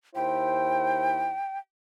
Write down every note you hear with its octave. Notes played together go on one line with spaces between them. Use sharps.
D#2 E4 C5 G5